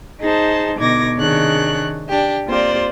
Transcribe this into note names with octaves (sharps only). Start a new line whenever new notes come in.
D#4 G#4 C5 A5
B2 D3 D#4 D6 G#6 A#6
C3 D#3 D4 G#4 C#5 F#6
D4 G4
A#3 C4 F4 G4 C5 D5